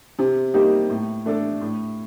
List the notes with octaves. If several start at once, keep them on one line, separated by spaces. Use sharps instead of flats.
C3
G3 A#3 D#4 G4
A2
A3 D4 A4
A2